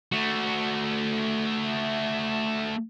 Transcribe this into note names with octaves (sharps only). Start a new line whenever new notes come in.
A3 F#4